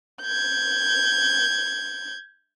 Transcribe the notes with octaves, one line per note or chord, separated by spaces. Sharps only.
G6 G#6